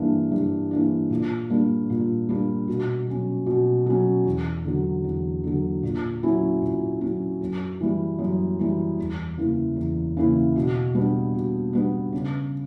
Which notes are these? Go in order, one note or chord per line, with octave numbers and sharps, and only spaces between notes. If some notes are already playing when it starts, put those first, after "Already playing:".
Already playing: G2 E3 A#3 D4
G2
E3 A#3 D4
A#2
G3 A#3 D4
A#2
G3 A#3 D4
B2
F#3 C#4
B2
F#3 C#4
E2
D3 F#3
E2
D3 F#3
A#2
F#3 C#4 E4
A#2
F#3 C#4 E4
F#2
E3 G3
F#2
E3 G3
E2
C#3 E3 A#3 E4
E2
C#3 E3 A#3 E4
B2
G3 B3 D4
B2
G3 B3 D4
C#3